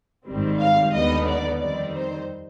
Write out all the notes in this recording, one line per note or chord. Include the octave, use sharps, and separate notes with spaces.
G#1 G#2 D#3 G3 C4
F5
D#2 D3 G3 B3 D#4 D#5
D5
F2 D#3 G3 C4 D#4 D5
C5